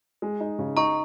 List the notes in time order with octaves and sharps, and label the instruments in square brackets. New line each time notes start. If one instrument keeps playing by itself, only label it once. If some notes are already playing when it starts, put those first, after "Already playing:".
[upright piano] G#3
D#4
C#3
[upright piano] D#4 [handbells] A#5 C#6